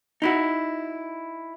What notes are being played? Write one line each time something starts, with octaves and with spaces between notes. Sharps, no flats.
D#4 E4 F#4